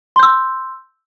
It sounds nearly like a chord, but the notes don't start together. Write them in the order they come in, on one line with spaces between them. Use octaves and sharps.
C6 G6 E6